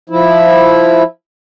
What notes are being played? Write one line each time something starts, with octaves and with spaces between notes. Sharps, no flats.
F3 E4